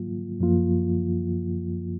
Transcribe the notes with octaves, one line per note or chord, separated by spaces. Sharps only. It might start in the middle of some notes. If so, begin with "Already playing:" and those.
Already playing: G#2 F#3 A#3 F4
F#2 F3 A#3 F4